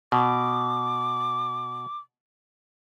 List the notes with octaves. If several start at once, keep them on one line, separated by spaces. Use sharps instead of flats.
B2 D6